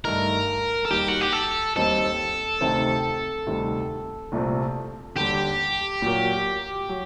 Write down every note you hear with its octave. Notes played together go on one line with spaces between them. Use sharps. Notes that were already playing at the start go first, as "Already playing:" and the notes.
G2 D#3 A3 D#4 A#4
A4
D#2 D#3 G3 G4
F#4
G4
A4
D#2 D#3 G3 C4 D#4 A4
D2 C3 D#3 A3 C4
D2 C3 D#3 G3
C2 A#2 A3 C4
D#2 D3 G3 D4 G4
A#2 F#3 A#3
F#3